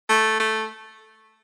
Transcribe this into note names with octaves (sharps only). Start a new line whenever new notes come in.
A3
A3